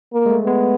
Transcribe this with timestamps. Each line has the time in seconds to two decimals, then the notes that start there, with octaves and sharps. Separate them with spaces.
0.13 A#3
0.26 G#3
0.30 A3
0.46 G#3 B3